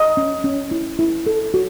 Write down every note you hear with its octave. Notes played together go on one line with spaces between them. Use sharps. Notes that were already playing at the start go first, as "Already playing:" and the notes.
Already playing: D#5
C#4
C#4
E4
E4
A4
F#4